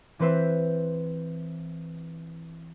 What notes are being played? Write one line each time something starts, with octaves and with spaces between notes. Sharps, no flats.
E3 C4 B4 C5 E5